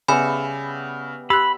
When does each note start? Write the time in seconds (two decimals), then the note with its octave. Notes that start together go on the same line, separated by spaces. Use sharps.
0.08 C#3 G3 B3 E5 G#5 B5
1.30 G4 B5 E6 F#6